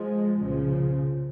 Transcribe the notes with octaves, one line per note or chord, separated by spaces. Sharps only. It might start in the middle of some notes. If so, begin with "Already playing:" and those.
Already playing: F3 G#3
C2 A#2 C#3 F3